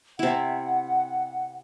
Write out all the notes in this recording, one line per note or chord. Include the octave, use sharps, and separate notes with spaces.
C3 E4 F#5